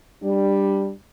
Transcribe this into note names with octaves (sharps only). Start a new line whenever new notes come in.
G3 D4